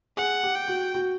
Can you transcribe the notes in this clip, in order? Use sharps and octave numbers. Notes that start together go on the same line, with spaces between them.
G#4 F#5
G4
G5
F#4
F#4